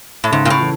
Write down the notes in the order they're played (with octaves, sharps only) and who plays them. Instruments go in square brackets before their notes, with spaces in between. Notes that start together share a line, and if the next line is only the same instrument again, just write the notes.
[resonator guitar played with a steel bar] A2
[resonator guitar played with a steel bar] G#2 [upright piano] C#3
[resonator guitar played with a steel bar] A#2
A2
[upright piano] E3